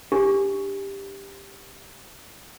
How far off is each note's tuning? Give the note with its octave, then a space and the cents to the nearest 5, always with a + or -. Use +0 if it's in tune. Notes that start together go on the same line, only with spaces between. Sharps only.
D4 +0 G4 +10